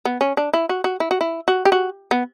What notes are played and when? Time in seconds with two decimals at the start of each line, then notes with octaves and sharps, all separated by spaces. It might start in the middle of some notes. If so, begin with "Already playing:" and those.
0.05 B3
0.21 C#4
0.37 D4
0.53 E4
0.69 F#4
0.84 F#4
1.00 E4
1.11 F#4
1.21 E4
1.48 F#4
1.65 G4
1.72 F#4
2.11 B3